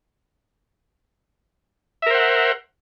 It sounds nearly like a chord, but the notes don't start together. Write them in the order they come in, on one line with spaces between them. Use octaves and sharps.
E5 A#4 C5 F#5